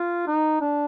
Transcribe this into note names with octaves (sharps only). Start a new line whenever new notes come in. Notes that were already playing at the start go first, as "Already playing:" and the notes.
Already playing: F4
D#4
D4